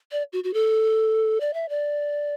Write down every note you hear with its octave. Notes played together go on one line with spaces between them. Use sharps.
D5
F#4
F#4
A4
D5
E5
D5